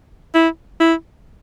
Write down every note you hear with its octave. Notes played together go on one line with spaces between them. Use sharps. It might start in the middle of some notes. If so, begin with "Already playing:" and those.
E4
E4